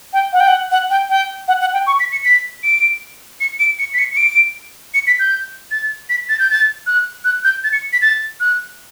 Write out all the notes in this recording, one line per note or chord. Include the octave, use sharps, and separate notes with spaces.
G5
F#5
G5
F#5
F#5
G5
G5
F#5
F#5
G5
C#6
B6
C#7
B6
D7
C#7
D7
C#7
B6
C#7
C#7
D7
C#7
B6
G6
A6
B6
A6
G6
A6
F#6
F#6
G6
A6
C#7
B6
A6
F#6